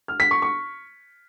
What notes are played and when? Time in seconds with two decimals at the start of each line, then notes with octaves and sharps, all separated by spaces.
0.08 F6
0.20 B6
0.31 C#6
0.42 C#6